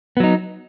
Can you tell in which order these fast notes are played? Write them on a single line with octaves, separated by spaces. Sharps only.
B3 F#3 D#4